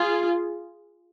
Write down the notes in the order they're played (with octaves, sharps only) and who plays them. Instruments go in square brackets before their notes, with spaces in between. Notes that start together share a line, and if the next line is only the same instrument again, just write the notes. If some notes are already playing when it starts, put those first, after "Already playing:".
Already playing: [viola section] F4 G#4